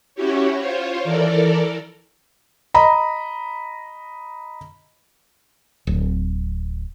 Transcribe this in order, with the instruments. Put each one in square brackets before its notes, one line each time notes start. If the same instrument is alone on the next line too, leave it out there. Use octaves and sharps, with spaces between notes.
[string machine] C#4 E4 F#4 G4 C#5
F4 C5 C#5
E3 A4 A#4 D5
[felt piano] D#5 A#5 B5
[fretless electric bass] D1